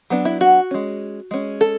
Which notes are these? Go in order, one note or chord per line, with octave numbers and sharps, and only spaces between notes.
F#3 B3 D4
E4
F#4
G#3 C#4
G#3 C#4
A4